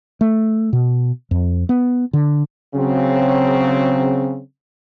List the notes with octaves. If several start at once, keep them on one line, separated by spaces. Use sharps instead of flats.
A3
B2
F2
B3
D3
C#3 F#3 C4